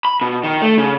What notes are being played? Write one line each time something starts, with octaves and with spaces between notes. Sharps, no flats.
B5
B2
D#3
A3
C#3